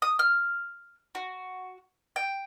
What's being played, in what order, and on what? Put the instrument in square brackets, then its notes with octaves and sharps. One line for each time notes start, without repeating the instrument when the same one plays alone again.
[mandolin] D#6
F6
F#4
G5